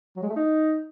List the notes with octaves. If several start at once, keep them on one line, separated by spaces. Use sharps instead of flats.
F#3
G#3
A3
D#4